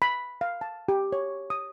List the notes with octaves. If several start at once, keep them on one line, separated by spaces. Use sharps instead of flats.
B5
F5
A5
G4
C#5
D#6